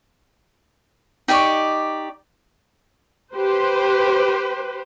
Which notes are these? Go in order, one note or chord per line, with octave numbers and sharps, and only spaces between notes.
D#4 G4 D5 C#6
G4 B4 C5